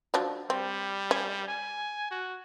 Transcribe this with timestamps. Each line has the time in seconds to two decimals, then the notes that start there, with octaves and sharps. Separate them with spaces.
0.14 F3 F#3 D4
0.50 G3 C4
1.11 C#4
1.48 G#5
2.11 F#4